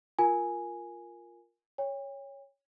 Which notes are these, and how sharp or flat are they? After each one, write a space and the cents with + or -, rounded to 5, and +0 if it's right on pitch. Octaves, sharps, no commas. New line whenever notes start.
F4 +0 A#4 +0 G#5 +0
C#5 +0 G5 +40